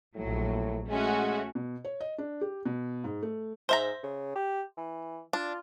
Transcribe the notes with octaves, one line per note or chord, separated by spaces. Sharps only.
A#1 A2 F#3
G#3 A3 C#4 F#4
B2
C#5
D#5
D4
G4
B2
G#2
A3
G#2 C5 E5 A#5
C#3
G4
E3
D4 F4